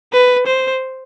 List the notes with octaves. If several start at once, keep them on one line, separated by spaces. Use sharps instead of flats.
B4
C5